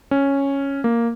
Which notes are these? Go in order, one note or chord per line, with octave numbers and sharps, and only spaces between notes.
C#4
A#3